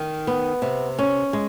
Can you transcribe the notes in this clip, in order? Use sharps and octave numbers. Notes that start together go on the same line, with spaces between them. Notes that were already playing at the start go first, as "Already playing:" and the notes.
Already playing: D#3
B3
C3
C#4
G#3